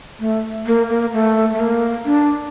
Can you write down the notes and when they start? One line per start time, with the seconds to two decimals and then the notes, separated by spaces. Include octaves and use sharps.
0.20 A3
0.66 A#3
0.90 A#3
1.13 A3
1.53 A3
1.60 A#3
2.05 D4